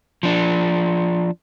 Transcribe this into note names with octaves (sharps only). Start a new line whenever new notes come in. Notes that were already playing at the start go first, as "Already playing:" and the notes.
F3 D4